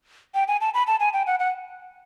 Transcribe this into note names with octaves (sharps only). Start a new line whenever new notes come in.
G5
G#5
A5
B5
A5
G#5
G5
F#5
F#5